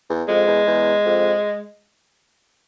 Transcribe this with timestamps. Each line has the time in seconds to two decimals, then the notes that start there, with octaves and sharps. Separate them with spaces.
0.10 E2
0.28 F2 G#3
0.47 E2
0.66 E2
1.05 F2